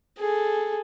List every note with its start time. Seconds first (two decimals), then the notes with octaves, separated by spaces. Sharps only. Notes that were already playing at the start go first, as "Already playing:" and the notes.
0.18 G#4 A4